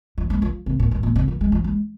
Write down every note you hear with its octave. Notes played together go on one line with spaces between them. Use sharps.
F3
G#3
F3
C3
A#2
G#2
A#2
C3
F3
G#3
F3
G#3